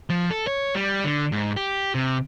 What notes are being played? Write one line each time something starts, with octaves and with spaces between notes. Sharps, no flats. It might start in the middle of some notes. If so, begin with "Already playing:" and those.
F3
A4
C#5
G3
D3
G#2
G4
C3